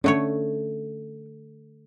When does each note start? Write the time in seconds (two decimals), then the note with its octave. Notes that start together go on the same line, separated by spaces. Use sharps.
0.04 D3 A3 C#4 C#5